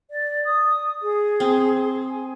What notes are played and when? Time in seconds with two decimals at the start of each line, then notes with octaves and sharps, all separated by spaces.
0.11 D5
0.45 D#6
1.02 G#4
1.40 C4
2.09 G#5